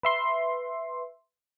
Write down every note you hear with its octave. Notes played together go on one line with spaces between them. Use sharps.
B4 E5 C6